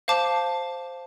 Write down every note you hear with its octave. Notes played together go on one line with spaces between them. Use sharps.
C5 F5 A5 D6